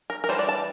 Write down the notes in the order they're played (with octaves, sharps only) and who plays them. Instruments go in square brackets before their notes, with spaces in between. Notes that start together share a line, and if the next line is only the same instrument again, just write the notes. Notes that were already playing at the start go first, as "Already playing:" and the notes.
[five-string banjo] A#4
A#4
E3 G3 D4 C5
D5
A5